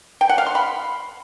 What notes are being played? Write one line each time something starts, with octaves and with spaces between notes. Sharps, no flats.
G5
F#5
F5
C6
B5